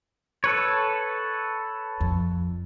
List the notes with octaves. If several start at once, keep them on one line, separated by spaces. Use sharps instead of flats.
A4 B4 C#5
F2